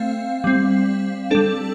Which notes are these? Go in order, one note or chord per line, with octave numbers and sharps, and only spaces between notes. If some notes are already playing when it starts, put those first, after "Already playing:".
Already playing: A3 C4 F5
G3 C4
G3 D4 A4